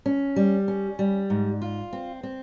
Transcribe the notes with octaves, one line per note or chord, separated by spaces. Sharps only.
C#4
G3
C#4
G3
G#2
F4
C4
C4